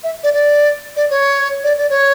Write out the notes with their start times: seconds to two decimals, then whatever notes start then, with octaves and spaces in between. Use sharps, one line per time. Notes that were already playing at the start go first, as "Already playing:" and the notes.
0.04 E5
0.23 D5
0.33 D5
0.96 D5
1.10 C#5
1.64 D5
1.78 D5
1.90 C#5